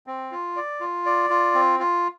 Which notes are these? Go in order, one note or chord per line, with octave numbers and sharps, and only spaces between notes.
C4
F4
D5
F4
D5
F4
C4
F4